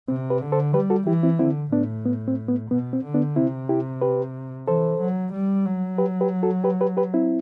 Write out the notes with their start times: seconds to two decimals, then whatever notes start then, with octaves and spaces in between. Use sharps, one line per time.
0.08 C3 C4
0.30 G4 B4
0.42 D3
0.52 A4 C5
0.74 G3 G4 B4
0.90 F#4 A4
1.07 E3 E4 G4
1.23 C4 E4
1.39 D3 C4 E4
1.72 A2 B3 D4
2.06 B3
2.28 C4
2.48 B3
2.70 B2 B3
2.93 C4
3.04 D3
3.14 B3 D4
3.36 C3 C4 E4
3.69 E4 G4
4.01 G4 B4
4.68 E3 A4 C5
5.01 F#3
5.33 G3
5.66 F#3
5.98 G4 B4
6.21 G4 B4
6.43 F#4 A4
6.64 G4 B4
6.81 G4 B4
6.97 G4 B4
7.14 C4 E4